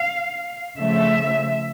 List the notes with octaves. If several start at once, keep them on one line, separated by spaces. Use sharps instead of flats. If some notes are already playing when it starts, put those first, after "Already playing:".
Already playing: F5
C#3 F3 A3 E5